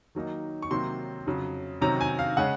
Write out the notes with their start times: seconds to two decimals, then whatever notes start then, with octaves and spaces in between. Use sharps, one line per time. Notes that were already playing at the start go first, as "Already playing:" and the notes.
0.15 D#3 F#3 A#3 D#4
0.62 C#6
0.71 C3 D#3 F#3 A#3 C6
1.26 F2 C#3 F#3
1.81 C3 D#3 F#3 C#4 A#5
2.01 G#5
2.19 F5
2.37 C#3 G#3 C#4 F#5